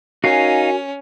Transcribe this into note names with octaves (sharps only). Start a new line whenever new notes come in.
C#4 D#4 F#4 A#4 F5 G#5